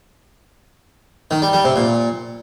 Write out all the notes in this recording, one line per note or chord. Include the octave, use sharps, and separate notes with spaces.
D#3
G3
G3
C3
A#2